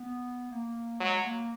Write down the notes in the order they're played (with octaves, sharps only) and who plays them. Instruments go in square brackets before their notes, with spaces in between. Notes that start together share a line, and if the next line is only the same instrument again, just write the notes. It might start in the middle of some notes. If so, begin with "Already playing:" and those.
Already playing: [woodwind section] B3
A#3
[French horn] F#3 [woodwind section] G#3
[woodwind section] A#3